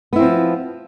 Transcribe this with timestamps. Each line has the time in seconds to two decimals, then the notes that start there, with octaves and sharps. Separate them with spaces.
0.13 B3
0.16 E4
0.19 C4
0.22 F3